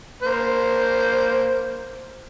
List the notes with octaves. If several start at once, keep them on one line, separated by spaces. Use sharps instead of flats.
A#3 C5